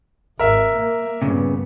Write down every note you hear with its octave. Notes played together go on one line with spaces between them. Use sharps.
G#1 A#4 E5
A#3
G2 A#2 C#3 B3